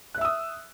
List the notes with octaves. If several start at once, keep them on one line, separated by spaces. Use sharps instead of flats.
E5 D#6 E6 F#6